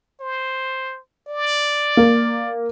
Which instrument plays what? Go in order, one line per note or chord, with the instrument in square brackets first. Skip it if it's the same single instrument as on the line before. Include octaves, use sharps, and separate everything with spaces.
[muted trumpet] C5
D5
[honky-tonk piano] A#3